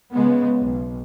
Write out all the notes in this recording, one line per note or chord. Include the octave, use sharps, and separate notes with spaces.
C#3 G#3 B3
B1